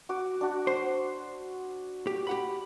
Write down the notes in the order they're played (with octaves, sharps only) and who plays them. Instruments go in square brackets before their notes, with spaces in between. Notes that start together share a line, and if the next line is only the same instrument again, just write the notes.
[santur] F#4 D6
D4 F#4
[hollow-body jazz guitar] C5
G4
G4 F#5 B5